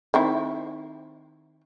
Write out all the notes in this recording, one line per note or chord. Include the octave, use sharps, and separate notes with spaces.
D#3 C4 E4